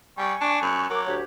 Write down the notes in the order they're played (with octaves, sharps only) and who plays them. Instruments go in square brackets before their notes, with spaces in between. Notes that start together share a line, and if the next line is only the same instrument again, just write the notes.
[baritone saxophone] G3 [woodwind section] G#5 C#6
[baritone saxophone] D4
F#2
[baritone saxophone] F#3 [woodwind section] A#4 D6
[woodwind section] D2 G4 C#5